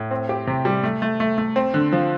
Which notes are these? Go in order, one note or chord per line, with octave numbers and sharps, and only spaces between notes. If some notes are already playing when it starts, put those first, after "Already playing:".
Already playing: A2
C4
G4
C3
G3
A3
A3
A3
A3
C4
D3
F3